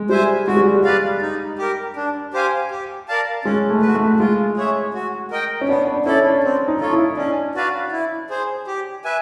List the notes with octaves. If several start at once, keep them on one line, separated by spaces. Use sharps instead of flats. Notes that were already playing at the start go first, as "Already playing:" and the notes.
Already playing: G#3
G3 C5 E5 G#5
G#3 F#4
G3
G3
B4 D5 F5
D#4
G4 A#4
D4
G4 C5 F5 G#5
G4
A#4 D5 F5 A5
G#3 C#4
A3
F#4 B4
A3
G#3 F4
G#4 C#5 E5
F#4
A#4 D#5 G5
C#4
B3 D4
D4
C#4 E4 A4 D5
D4
C4
D#4
F4 A4 C#5
E4
C#4 D4
F#4 B4 D5 F5
E4
G#4 C5
G4
B4 E5 G#5